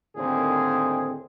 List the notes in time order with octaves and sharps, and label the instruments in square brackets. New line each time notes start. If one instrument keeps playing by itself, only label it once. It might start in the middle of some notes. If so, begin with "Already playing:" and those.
[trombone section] D#2 A2 D3 D#3 C4 G#4